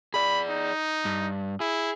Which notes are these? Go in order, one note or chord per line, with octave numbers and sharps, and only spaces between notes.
G#4 D5 B5
D#4
G2
E4 G#4